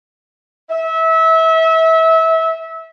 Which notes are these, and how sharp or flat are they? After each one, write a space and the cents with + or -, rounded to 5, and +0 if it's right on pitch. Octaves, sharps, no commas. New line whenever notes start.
E5 -25